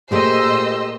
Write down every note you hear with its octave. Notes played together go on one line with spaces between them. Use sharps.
A#2 A3 G4 G#4 C5 D#5 E6